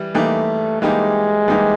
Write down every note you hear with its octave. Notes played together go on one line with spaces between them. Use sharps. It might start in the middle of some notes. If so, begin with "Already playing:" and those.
Already playing: E3 G3
E3 G3 A3 A#3 D#4 G4
E3 G3 G#3 A#3 D#4 G4
E3 G3 A#3 D#4 G4